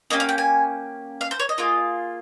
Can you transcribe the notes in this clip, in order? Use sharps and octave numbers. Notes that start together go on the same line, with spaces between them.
A#3 C#4 G4 D#5
F5
G5
G#5
F5
C5
C#5
D#5
A#3 F4 G#4